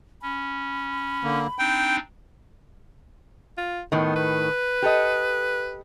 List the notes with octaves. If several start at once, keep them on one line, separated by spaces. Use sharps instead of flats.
C#4 B5
D3 A#3
C4 D4 D#4 G5
F4
A2 D#3 B3
B4
G4 A4 D#5